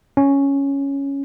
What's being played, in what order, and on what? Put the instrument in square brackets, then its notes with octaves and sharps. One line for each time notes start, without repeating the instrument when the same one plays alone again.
[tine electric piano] C#4